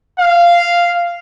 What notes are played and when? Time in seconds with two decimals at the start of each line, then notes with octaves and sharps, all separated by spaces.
0.19 F5